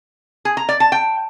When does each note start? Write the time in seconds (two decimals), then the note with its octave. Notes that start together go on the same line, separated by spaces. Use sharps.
0.45 G#4
0.57 A#5
0.69 D5
0.80 A5
0.92 G5